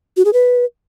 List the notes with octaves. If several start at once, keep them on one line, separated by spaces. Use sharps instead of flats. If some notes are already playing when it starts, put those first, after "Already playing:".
F#4
G#4
B4